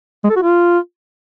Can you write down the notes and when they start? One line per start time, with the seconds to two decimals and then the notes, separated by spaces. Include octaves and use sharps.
0.24 G#3
0.30 A4
0.36 F#4
0.42 F4